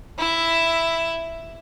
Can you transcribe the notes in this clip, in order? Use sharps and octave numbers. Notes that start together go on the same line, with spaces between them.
E4 E5